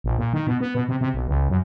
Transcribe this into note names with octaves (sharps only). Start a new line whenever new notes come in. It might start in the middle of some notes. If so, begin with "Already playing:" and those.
A#1
A#2
D#3
B2
B3
B2
C3
C3
B1
C#2
F#2